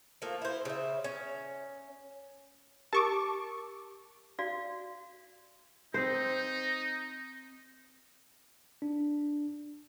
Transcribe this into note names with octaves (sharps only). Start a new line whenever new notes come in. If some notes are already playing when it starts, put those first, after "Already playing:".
F3 A3 A#3
E4 C5
C#3 E5
C#4
G4 A#4 A5 C#6 D6
F#4 D5 F5
C4 D#4 C5
D4